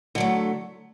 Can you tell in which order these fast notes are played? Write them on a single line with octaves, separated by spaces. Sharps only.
D3 F#3 A3